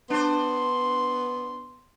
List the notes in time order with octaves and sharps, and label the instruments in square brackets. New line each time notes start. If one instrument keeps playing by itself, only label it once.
[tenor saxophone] B3 [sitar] D4 C5 [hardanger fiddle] C6